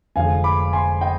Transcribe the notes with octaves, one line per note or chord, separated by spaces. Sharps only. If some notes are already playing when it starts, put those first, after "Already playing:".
F1 F2 D3 F3 G#3 F5 G#5
B5 D6
G#5 C6
D#5 G5